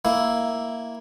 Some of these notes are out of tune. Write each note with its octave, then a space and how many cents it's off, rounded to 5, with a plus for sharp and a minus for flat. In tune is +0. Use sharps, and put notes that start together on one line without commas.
A#3 +0 E4 +0